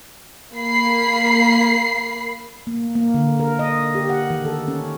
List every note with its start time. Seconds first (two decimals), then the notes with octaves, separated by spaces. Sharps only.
0.55 A#3 B5 C7
2.67 A#3
2.95 A#3
3.14 D3
3.40 A#4
3.59 D#5
3.95 G4
4.09 F#5
4.30 D#3
4.45 A4
4.68 C#4